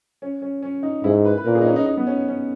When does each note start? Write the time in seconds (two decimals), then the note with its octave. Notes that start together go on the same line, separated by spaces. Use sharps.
0.22 C#4
0.42 C#4
0.62 C#4
0.83 D#4
1.04 G#2 E4
1.25 B4
1.38 B4
1.45 A#2 A#4
1.55 G#4
1.61 D#4
1.67 C#4
1.76 D#4
1.86 D#4
1.97 B3
2.07 C#4
2.28 C#4